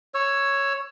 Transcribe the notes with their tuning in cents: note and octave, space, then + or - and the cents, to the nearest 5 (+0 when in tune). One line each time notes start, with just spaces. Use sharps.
C#5 +0 E6 +20